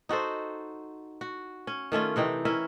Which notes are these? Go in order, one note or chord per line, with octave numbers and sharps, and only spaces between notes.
D#4 F#4 A4 C5
F#4
C#4
D#3 A3 C#4 F4
C3 E3 D#4 G5
C#4 E4 A#4 E5